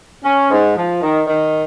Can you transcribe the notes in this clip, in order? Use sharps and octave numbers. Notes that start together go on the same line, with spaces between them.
C#4
G#2
F3
D#3
D#3